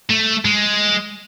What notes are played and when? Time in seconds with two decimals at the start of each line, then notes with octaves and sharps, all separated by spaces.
0.09 A3
0.45 G#3